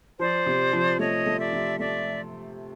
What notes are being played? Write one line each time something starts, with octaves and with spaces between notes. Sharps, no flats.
F3 C5 D5
C3
F3
A3 C#5 D#5
A3
D5 E5
C3
A3 D5 E5